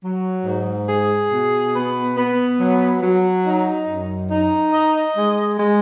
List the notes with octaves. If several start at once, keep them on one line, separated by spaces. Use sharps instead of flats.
F#3
G#2
G#4
B2
B3
B3
F#3
F#3
D#4
F#2
D#4
D#5
G#3
G#3